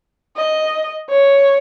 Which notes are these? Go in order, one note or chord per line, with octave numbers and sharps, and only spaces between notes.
D#5
C#5